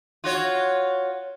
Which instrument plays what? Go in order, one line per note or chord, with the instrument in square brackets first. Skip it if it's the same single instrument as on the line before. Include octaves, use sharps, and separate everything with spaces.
[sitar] F4 F#4 C#5